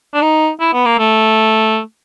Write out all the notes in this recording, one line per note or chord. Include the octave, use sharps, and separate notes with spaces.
D4
D#4
E4
B3
A#3
A3